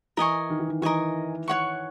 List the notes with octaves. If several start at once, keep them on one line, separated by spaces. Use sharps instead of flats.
E3 A#4 D#5 G#5 C#6
D#3
E3
D#3
E3 A#4 D#5 G#5 C#6
C#5 F#5 C#6